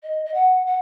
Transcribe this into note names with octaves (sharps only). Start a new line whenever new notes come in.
D#5
D#5
F#5
F#5